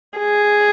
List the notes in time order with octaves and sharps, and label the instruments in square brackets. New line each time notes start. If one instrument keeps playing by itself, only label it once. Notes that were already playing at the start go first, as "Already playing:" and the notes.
[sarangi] G#4